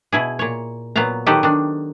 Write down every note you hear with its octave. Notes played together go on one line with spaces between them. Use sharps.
B2 E4 G#4
A#2 C#5
A#2 F#3 B3 F5 A#5
D#3 F#3 D#4 G4 A4 B4
D#3 D4